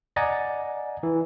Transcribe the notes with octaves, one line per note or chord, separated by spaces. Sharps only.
D5 D#5 F#5 G#5 A#5 A6
E3